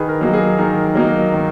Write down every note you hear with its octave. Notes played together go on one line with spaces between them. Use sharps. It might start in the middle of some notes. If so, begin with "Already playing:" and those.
Already playing: D#3 G#4 B4
A#4
F#3 A#3 D#4
G#4
D#3 A#4
F#3 A#3 D#4
D#3